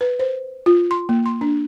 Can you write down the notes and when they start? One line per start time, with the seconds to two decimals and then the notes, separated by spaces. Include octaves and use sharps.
0.01 B4
0.19 C5
0.66 F4
0.91 C6
1.09 A#3
1.26 C6
1.41 D4